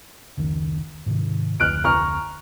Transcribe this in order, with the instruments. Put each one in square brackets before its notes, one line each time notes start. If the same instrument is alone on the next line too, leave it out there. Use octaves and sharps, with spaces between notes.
[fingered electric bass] F1 C#2 D#3
G#2 C3 D#3
[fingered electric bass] F1 D2 [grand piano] F6 F#6 D7
[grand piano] A#5 C#6 F6